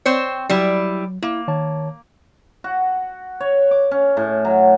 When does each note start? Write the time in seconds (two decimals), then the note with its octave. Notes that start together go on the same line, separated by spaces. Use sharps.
0.06 C4 C5 C#5
0.50 F#3 G3 E4
1.23 A#3 E4
1.48 D#3 C#5 A5
2.64 F#4
3.40 C#5
3.71 D6
3.91 C#4
4.17 A2
4.45 F#3